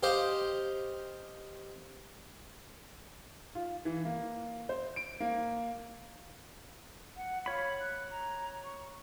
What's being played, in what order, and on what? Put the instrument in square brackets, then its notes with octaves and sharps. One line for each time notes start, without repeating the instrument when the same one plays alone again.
[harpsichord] G4 C5 D#5 F5
[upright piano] F4
E3
A#3
C5
D7
A#3
[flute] F#5
[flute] F4 [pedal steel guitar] C#5 B5
[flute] F#6
A#5
C#6